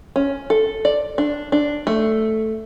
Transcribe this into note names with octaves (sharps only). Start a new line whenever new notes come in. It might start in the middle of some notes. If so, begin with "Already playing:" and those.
C#4
A4
D5
D4
D4
A3